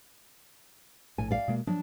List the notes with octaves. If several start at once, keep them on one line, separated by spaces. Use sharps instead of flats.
A#1 A2 G#5
D5 F5
B2 G#3 A#3
F3 F#3 D4